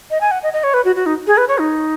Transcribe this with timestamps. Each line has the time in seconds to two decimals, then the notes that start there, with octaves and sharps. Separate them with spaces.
0.11 D#5
0.21 G#5
0.31 F#5
0.43 D#5
0.53 D#5
0.64 C#5
0.74 B4
0.85 F#4
0.96 F#4
1.06 D#4
1.27 G#4
1.37 B4
1.48 C#5
1.58 D#4